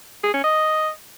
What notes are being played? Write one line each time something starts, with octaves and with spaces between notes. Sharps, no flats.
G#4
C#4
D#5